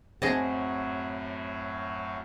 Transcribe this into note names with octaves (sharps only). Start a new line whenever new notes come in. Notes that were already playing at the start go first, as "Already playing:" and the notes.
F#2 A2 F#3 C4 G#4 D#5 A5